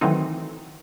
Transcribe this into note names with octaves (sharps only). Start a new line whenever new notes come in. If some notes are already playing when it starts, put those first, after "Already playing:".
D#3 E3 F#3 A3 C4 D#4